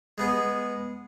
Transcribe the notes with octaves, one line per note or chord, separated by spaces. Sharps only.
G#3 B3 G#4